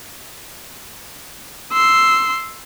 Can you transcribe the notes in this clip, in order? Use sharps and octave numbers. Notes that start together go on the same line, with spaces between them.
C6 E6